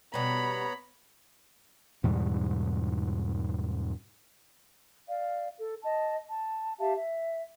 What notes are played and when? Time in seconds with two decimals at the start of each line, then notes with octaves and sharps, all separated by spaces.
0.14 B2 G3 B3 C#5 A#5 B5
2.04 E2 G#2 B2 G3
5.08 D5 F5
5.58 A4
5.83 D#5 A5
6.27 A5
6.79 G4 E5 F5 A5
6.94 E5